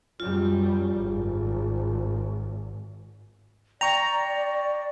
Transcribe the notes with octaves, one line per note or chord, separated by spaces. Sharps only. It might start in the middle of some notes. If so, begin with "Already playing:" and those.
F#2 G3 F4
G#1
D5 G5 A#5 C#6